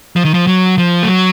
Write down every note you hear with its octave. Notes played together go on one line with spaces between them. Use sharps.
F3
D#3
F3
F#3
F3
A3
F#3